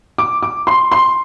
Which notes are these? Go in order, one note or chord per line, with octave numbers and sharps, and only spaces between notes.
D6
D6
C6
C6